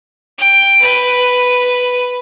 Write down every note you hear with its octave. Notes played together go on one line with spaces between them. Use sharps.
G5
B4